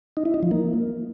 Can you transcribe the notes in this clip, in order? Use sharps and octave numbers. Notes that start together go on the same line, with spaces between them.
D#4
E4
D#4
F3
A#3